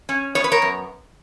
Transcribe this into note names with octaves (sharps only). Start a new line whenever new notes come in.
C#4
B3 C#5
B4
A#4 C#5
F#2